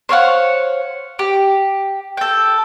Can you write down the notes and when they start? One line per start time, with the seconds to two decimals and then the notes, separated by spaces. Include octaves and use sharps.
0.09 C5 C#5 F5 F#5
1.19 G4
2.17 A4 G5